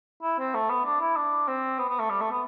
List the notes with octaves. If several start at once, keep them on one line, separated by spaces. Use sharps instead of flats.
E4
C4
A3
B3
D4
E4
D4
C4
B3
B3
A3
G3
A3
B3